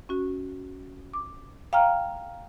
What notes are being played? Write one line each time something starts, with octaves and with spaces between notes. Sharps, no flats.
C#4 F#4
D6
F5 G5 A#5 F6